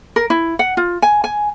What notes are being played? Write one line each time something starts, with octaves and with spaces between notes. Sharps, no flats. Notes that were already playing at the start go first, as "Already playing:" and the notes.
A#4
E4
F#5
F4
G#5
G#5